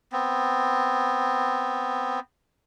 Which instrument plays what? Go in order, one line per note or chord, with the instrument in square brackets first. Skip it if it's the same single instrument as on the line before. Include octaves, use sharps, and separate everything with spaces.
[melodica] B3 C4